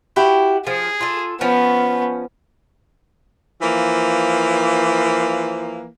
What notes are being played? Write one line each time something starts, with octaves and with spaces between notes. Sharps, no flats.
E4 F#4 G4
F3 G#4
F4 A4
F3 B3 C#4
E3 F3 A#3